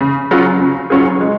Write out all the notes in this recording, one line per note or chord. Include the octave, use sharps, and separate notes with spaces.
C#3
F#3 C#4 F4 G#4
C#3
F#3 C#4 F4 G#4
G#3